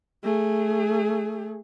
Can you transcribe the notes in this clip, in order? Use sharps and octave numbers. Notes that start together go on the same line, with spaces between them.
A3 G#4